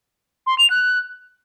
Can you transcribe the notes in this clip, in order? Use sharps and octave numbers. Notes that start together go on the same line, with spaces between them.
C6
F7
F#6